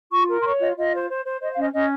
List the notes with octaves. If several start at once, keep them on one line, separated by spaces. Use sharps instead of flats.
F4 C#6
A#4
C6
C#5 C#6
F4 D#5
F4 D#5
C5
C5
C5
C5 D#5
F5
C#4 D#5
C#4 D#5